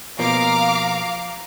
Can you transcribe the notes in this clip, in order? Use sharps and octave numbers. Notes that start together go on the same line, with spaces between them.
B2 F3 A#3 F5 A#5 D6